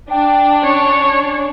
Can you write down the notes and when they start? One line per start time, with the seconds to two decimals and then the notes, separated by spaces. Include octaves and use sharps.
0.11 D4 G5
0.63 C#4 C#5